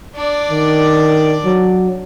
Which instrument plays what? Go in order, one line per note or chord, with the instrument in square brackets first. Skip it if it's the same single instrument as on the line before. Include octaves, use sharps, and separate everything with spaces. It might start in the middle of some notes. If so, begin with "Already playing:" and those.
[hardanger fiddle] D4 D5
[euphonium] D#3
F#3